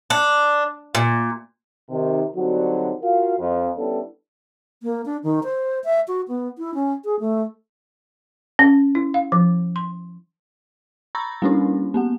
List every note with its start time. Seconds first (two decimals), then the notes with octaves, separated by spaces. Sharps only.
0.10 D4
0.95 A#2
1.90 C3 D#3
2.35 D3 F#3 G3 C4 D#4 F#4
3.02 F4 F#4 A#4 F5
3.39 F2
3.77 G3 B3 C#4 D4 E4 A4
4.83 A#3
5.06 D4
5.24 D#3
5.44 C5
5.84 E5
6.08 F#4
6.28 B3
6.58 E4
6.74 C#4
7.05 G#4
7.20 A3
8.59 C#4
8.95 E4
9.14 F5
9.32 F3
9.76 C6
11.15 A#5 B5 C#6 E6 A6 A#6
11.42 G3 A#3 C#4 D4 E4
11.94 A#3 B3 F#5